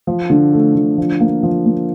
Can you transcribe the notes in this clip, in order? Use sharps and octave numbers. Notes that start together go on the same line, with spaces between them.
F3
D3
A3
D3
F3
A#3
F3
A#3